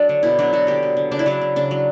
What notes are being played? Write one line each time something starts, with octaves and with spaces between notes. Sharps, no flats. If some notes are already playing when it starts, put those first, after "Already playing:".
Already playing: F#3 D4
D3
B2 E4
F#3 D4
B2 F#4
D3 G4
F#3
D3
C#3 D4
E4
F#3 D4
C#3
C#3 D4
F#3